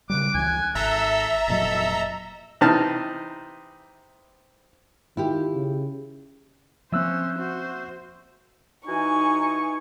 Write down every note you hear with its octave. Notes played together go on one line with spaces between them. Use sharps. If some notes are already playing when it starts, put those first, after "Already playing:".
C#3 E3 G3 D6 F#6
C#2 E3 G#5
G#1 A4 E5 A#5 E6
F1 A#2 F#3 A4 D#5
C3 E3 D#4 A5 F6
D#3 E4 F4 G4
C#3
F3 A#3 C4 C#4 C5 E5 E6 F#6
F#4 C5
E3 D#4 F#4 G#5 C#6